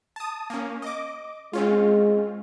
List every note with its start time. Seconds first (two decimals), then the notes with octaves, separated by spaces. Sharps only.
0.16 A5 D#6
0.50 A#3 C#4
0.82 D#5 D6
1.53 G#3 C4 C#4 F4